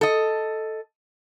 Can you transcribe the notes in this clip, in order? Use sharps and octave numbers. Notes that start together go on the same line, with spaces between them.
A4 D#5